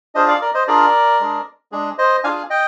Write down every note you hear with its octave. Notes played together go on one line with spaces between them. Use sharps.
D4 F4 G#4 C5 D#5
D5 F5
A#4 D5
C5 D#5
D4 F4 G#4 A#4 D5
G#3 D4 G#4
G#3 D4 G#4
C5 D#5
D4 F4 G#4 F5 G#5
D#5 G5